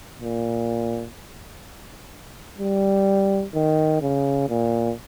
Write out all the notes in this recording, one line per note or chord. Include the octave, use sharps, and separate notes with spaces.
A#2
G3
D#3
C#3
A#2